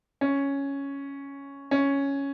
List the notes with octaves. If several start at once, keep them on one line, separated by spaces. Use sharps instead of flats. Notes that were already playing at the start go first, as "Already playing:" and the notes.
C#4
C#4